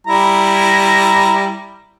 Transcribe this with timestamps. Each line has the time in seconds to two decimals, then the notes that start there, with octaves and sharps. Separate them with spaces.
0.07 G3 E4 A#5